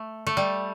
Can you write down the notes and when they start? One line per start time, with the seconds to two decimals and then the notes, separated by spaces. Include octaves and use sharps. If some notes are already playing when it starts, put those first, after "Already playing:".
Already playing: A3
0.27 A3
0.37 G3